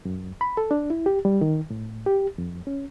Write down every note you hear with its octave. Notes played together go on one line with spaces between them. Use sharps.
F#2
B5
A4
D4
E4
G4
G3
D#3
A2
G4
F2
C#4